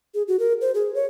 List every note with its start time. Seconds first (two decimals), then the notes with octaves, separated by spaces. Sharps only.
0.15 G#4
0.28 F#4
0.39 A#4
0.61 C5
0.75 G#4
0.95 C#5